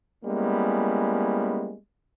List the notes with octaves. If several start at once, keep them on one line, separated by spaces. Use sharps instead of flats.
G3 G#3 A#3 B3 C#4 E4